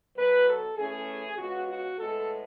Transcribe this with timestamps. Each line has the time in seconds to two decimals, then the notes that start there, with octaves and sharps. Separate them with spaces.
0.16 B2 F#3 B3 B4
0.47 A4
0.77 E3 A3 C#4 G#4
1.37 C#3 G#3 B3 F#4
1.68 F#4
1.99 A2 G#3 B3 A4